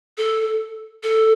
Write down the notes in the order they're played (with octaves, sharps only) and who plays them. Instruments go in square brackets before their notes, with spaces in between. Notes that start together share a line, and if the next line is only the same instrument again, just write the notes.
[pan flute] A4
A4